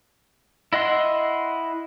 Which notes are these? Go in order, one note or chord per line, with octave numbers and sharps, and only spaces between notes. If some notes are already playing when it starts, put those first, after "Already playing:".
E4 D#5 F#5 C6